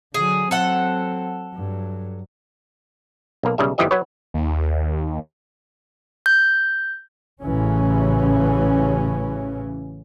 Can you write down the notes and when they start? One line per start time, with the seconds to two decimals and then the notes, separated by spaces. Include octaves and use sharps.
0.14 D3 F#3 G#4
0.51 F#3 C4 A4 F#5
1.55 G2 F#3
3.43 B1 A#3
3.58 B1 C#3 G3 E5
3.78 G1 E3 F3 G4 D#5 E5
3.91 F#3 B4 C#5
4.34 D#2
6.26 G6
7.43 A1 C#3 E3 C#4